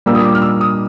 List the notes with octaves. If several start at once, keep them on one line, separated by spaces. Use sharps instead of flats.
A#2 G3 A#3 D4 E6
D#6
D6
F6
E6
D#6